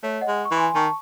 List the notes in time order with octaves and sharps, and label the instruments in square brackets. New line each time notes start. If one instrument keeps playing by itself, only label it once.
[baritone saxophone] A3 [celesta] C#5
[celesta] D#5 F#5
[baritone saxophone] G#3
[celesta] C#6
[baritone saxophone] E3
[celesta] G#5 C6
[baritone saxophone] D#3 [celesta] A5 C#6